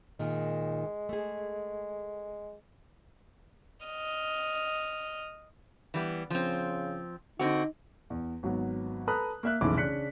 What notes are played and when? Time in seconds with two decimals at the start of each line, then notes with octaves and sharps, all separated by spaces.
0.19 A#2 D#3 G#3
1.09 A3 G#4
3.86 D#5 F6
5.94 E3 G3 B3
6.30 C#3 F3 C4
7.39 D3 C4 D#4 F#4
8.10 E2
8.43 G#1 F#3 B3
9.07 A4 B4 A#5 B5 D#6 F#6
9.43 A#3 E5 F#6
9.61 F1 B1 C#3 E3 E4 D6
9.77 C#3 D4 F#6 B6 C#7